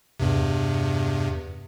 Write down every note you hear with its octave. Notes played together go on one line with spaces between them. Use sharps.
E2 G2 C3